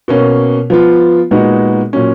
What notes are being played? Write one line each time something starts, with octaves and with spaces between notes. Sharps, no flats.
B2 A#3 C#4
F3 B3 F4
A#2 G#3 B3 D#4 F#4
A#2 F#3 C#4